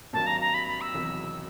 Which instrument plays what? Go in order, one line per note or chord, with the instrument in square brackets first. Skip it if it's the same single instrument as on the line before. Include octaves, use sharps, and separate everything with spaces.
[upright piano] G#1 G2 D#3 F#3 A#3 [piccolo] A5
[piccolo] A#5
A#5
B5
B5
E6
[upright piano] E1 E2 C3 D#3 F#3